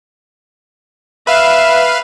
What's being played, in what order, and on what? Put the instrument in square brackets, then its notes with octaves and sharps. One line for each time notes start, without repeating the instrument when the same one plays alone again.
[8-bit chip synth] B4 F5 [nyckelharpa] E5